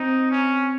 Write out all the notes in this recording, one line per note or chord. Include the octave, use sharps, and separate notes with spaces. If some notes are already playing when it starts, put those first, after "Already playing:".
Already playing: C4 D#4
C#4